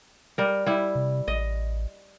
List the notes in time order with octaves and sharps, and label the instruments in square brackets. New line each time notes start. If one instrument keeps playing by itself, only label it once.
[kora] G3 A#4
G3 E4
[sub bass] C3
[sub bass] A1 [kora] D#5